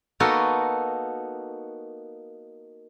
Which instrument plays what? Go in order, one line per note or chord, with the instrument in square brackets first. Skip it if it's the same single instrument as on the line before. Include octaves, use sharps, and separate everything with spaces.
[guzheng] A#3 B3 D#4 F#4 A4 A#4